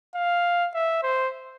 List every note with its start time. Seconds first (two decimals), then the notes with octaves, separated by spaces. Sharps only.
0.15 F5
0.74 E5
1.03 C5